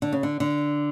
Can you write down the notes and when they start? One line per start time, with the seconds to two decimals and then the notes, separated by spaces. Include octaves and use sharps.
0.02 D3
0.13 C#3
0.23 D3
0.40 D3